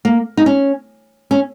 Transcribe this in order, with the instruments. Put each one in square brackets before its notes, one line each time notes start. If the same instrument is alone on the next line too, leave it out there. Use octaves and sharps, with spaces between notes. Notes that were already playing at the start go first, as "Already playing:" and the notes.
[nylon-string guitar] A#3
D#4
C#4
C#4